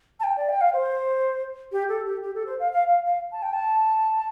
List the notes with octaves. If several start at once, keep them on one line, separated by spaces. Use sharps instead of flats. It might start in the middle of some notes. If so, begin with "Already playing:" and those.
A5
G5
D5
G5
F5
C5
G4
A4
G4
G4
A4
C5
F5
F5
F5
F5
A5
G5
A5